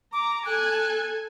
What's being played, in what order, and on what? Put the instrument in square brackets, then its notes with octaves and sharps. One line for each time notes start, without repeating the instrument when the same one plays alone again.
[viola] A#5 [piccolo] D6
[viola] A4 G#5 [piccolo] F#6